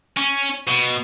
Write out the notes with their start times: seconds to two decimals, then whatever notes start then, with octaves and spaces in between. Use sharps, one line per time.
0.17 C#4
0.68 B2